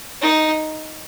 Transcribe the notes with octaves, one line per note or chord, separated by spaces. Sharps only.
D#4